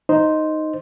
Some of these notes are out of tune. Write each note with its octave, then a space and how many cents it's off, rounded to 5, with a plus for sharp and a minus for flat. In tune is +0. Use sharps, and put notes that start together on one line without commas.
D#4 +0 C5 +0